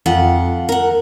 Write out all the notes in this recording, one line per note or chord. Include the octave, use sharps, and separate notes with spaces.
F2 F4 F#5
A#4 F#5